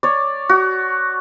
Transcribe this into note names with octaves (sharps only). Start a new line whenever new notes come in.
C#5 D5
F#4